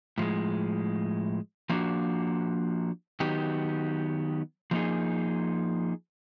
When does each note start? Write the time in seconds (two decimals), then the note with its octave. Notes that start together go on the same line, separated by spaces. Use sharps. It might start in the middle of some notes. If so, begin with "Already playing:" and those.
0.18 A2 F3 G#3
1.69 F3 A#3 D4 F#4
3.20 D#3 F#3 B3 D#4 G4
4.71 F3 A#3 D#4 G#4